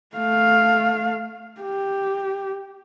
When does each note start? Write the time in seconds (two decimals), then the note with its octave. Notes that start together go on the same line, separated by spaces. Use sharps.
0.16 A3 F5
1.61 G4